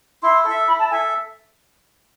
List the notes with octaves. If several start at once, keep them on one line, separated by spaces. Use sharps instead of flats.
E4 C6
A4
E5
E4 B5
A5
A4 E5 G#5